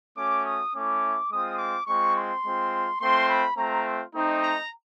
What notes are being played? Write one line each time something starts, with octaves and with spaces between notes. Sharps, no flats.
A3 C#4 F#4 D6
D#6
A3 C#4 E4 D6
G#3 C4 F4 D#6
D6
G#3 C4 F4 C#6
C6
G#3 C4 F4
A3 C4 F4 C6
B5
A3 C4 F4 A#5
A3 C4 D#4
A#5